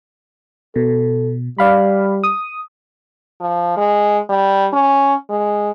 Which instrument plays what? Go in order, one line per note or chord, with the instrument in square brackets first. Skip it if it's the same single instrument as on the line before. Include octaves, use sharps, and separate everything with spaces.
[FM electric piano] B2 [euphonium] A4
[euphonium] G3 [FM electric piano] D5 F5 B5
[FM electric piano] D#6
[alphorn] F3
G#3
G3
C#4
G#3